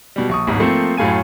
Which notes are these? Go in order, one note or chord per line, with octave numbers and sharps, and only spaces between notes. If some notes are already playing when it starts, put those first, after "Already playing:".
B2 G3
A#1 C#6 D#6
D1 G#1 G#2 B2
F3 A3 A#3 C4
F#2 A2 A3 F5 G#5 D#7